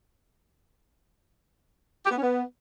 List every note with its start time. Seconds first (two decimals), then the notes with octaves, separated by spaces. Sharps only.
2.05 G4
2.11 B3
2.16 C#4
2.22 B3